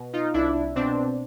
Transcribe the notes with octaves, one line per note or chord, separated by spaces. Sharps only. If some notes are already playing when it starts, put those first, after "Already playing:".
Already playing: B2
D#4 F4
C2 D4 E4
B2 C4 D4